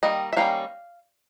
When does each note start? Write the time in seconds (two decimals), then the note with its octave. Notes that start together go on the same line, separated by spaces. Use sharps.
0.03 D#3 G3 A#3 D#5
0.33 E5
0.36 D#3 G3 A#3 C#4 F5